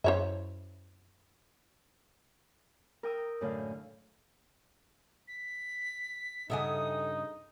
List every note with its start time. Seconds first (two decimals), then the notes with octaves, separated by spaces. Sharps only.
0.04 F#2 E4 C5 C#5 E5
3.03 A#4 G5 D#6 E6
3.41 F#2 A2 D3 F5
5.28 B6
6.50 G2 C#3 D#4 A4 E5 F#5 G#5 D#6